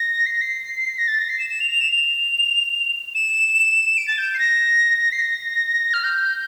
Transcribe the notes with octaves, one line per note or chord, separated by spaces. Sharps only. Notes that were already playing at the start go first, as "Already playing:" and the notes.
Already playing: A#6
C7
A#6
C7
A#6
A6
A#6
C7
E7
E7
F7
F7
E7
F7
E7
D7
A6
G6
C7
A#6
C7
A#6
F6
G6